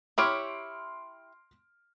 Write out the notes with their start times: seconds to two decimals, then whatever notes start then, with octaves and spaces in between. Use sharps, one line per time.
0.18 E4 G4 C#5 C6 F6 D7